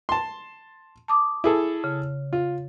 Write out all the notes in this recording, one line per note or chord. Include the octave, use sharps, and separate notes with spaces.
A5 C6
A5 D6 D#6
E4 G#4 A4
C#3
F4